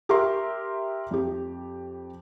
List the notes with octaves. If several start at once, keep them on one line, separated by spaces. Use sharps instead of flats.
G4 A#4 E5 C6
F2 G4